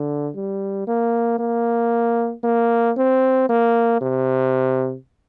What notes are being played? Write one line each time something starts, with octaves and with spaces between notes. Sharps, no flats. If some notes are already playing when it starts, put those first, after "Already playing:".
Already playing: D3
G3
A#3
A#3
A#3
C4
A#3
C3